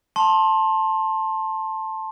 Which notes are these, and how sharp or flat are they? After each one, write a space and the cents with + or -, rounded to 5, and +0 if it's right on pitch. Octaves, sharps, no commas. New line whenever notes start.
A5 +0 C6 +25